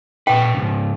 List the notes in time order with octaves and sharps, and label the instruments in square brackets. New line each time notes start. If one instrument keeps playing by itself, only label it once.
[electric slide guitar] A#2 B4 [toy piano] G5
[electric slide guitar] G#2 C#3